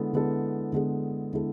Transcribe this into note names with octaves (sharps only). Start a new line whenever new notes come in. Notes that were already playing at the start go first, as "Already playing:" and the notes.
Already playing: D3 G#3 B3 E4 A4
D3 G#3 B3 E4 A4
D3 G#3 B3 E4 A4
D3 G#3 B3 E4 A4